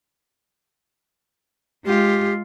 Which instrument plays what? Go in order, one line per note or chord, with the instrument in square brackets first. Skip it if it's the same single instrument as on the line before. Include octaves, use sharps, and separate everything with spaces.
[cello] G#3 F4 [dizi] G4